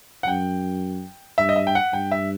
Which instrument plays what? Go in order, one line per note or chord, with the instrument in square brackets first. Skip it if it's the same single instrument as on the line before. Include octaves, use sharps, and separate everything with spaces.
[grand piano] F#5
[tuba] F#2 [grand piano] G5
[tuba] G2 [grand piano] E5
[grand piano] D#5
E5
G5
F#5
[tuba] G2 [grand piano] G5
[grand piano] E5